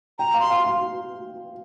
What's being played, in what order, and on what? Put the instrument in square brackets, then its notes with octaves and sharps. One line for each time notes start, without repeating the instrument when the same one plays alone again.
[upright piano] G5 [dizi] A#5
[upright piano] F5
[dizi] C6
[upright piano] F5
F5